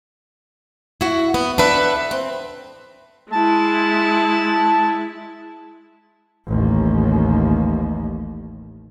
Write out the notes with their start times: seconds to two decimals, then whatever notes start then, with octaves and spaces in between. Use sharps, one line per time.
1.01 E4 F#4
1.34 B3
1.58 D4 A4 B4 E5
2.11 C4
3.32 G#3 E4 A5
6.47 A1 D#2